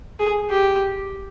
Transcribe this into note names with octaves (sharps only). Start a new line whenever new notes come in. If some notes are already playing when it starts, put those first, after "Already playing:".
G#4
G4